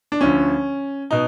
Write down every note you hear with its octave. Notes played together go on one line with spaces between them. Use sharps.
D4
D2 D3 F3 C#4
B2 D#4